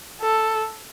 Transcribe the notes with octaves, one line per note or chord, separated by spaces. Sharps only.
A4